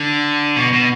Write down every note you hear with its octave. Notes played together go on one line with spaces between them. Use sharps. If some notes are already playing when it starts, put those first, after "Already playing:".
Already playing: D3
B2
B2